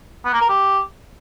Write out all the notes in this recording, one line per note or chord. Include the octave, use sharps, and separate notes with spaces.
B3
A#3
A#4
G4